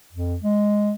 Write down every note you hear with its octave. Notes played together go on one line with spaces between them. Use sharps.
F2
G#3